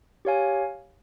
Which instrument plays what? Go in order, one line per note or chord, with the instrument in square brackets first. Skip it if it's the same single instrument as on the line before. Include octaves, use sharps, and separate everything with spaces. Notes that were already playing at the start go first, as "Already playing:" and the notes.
[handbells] G4 C#5 F5 G#5